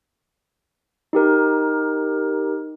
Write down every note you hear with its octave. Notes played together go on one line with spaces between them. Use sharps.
D#4 G4 A#4